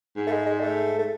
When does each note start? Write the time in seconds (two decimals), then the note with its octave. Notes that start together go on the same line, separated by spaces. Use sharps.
0.16 G#2
0.27 A3
0.31 G#3
0.46 G#3
0.61 A3
0.99 A3